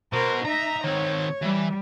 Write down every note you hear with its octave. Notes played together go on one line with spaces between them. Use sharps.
B2 A#4 C5
D#4 E5 A#5
D#3 C4 C#5
E3 G3